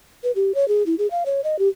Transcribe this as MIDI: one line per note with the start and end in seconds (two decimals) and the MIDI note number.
0.23 0.31 71
0.36 0.54 67
0.54 0.68 73
0.68 0.83 68
0.86 0.95 64
0.98 1.07 68
1.11 1.23 77
1.26 1.41 73
1.44 1.59 75
1.59 1.68 67